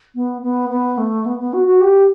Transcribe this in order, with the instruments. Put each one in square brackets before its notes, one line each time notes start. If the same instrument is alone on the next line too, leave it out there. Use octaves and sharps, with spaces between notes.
[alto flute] B3
B3
B3
A3
B3
B3
F#4
F#4
G4